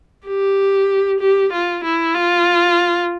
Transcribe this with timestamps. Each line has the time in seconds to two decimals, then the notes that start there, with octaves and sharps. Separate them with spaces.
0.26 G4
1.20 G4
1.53 F4
1.84 E4
2.15 F4